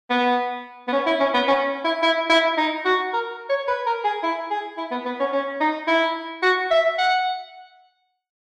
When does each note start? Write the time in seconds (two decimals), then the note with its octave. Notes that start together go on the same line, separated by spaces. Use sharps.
0.10 B3
0.88 B3
0.93 C#4
1.06 E4
1.20 C#4
1.34 B3
1.48 C#4
1.85 E4
2.03 E4
2.30 E4
2.58 D#4
2.85 F#4
3.13 A#4
3.49 C#5
3.68 B4
3.86 A#4
4.05 G#4
4.23 E4
4.51 G#4
4.78 E4
4.91 B3
5.06 B3
5.20 C#4
5.33 C#4
5.61 D#4
5.87 E4
6.43 F#4
6.71 E5
6.98 F#5